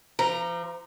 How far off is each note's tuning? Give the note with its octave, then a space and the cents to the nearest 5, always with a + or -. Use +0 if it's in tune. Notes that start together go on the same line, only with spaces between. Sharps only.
F3 -35 A#5 +0